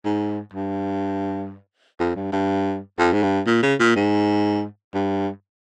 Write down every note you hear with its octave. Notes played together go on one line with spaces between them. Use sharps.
G#2
G2
F2
G2
G2
F2
G#2
G2
A#2
C#3
A#2
G#2
G2